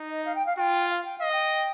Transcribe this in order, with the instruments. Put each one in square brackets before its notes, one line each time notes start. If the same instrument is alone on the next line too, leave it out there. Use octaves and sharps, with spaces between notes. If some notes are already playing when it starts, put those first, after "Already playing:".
Already playing: [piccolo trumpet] D#4
[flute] D#5
F5
G5
F5
[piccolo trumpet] F4 [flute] G5
[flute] F5
G5
[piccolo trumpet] D#5 [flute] F5
[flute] G5